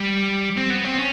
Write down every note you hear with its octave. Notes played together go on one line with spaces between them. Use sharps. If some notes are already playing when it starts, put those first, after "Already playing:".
Already playing: G3
C4
B3
C4
C#4